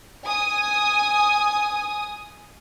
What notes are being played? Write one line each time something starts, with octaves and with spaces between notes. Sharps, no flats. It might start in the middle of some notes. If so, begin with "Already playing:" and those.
G#5 D#6